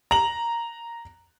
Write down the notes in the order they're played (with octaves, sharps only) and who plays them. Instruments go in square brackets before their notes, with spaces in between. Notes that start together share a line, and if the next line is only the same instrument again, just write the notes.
[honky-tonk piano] A#5 F#7